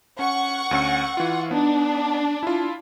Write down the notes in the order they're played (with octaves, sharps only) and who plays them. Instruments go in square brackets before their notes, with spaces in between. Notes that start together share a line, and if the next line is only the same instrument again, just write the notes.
[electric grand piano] C#4 [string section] F#5 C#6
[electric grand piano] D2 C#4 E6
E3 F4
[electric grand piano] B3 D#4 [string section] D4
[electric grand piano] E4 F4